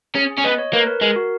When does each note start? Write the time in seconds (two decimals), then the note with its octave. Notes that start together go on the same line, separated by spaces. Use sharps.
0.15 C#4 G#4
0.38 C#4
0.44 B3 D#5
0.58 C#5
0.73 A#3 B4
0.87 A#4
1.02 G#3 A#4
1.16 F#4